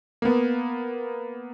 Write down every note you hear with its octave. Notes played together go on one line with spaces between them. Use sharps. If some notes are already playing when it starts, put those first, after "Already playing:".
A#3 B3